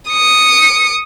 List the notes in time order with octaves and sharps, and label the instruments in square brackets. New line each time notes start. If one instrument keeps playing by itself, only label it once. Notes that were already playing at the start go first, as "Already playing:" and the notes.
[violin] D#6 C#7